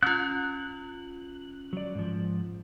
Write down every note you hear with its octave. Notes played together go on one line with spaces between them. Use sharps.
C#4 F4 F#6
F#3 D5
G#2 F3